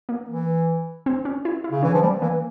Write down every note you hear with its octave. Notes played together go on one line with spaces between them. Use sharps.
A#3
E3
C4
C#4
E4
E4
C#3
E3 C#4
F3
G3 A#3
E3 A#3